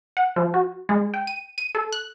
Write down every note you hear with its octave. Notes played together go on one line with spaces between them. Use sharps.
F#5
F3
F#4
G#3
G5
D#7
D#7
A4
F#6